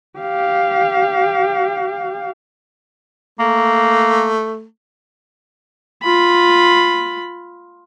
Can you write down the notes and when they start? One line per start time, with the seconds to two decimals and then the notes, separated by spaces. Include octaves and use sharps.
0.19 G4 F5
3.40 A3 A#3
6.03 F4 B5